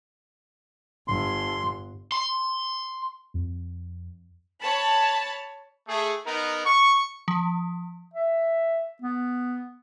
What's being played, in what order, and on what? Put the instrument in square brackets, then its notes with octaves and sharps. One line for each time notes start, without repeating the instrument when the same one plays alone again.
[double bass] G1 [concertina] C6
[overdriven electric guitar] C6
[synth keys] F2
[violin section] C#5 A5 B5
[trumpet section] A3 G#4
B3 D#4 A#4
C#6
[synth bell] F3
[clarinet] E5
B3